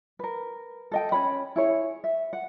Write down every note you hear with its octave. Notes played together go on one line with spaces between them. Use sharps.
A#4 B4
A4 D#5 G5
C#4 C#5 B5
E4 G#4 C#5
E5
F#5